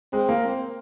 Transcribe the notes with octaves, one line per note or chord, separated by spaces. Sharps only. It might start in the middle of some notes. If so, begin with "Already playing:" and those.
G#3 C4
A#3
C4